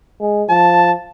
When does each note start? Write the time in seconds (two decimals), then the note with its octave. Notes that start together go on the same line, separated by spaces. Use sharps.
0.20 G#3
0.49 F3 A5